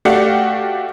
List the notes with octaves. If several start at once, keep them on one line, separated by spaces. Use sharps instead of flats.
A3 F#4 G4 D5 F5 C#7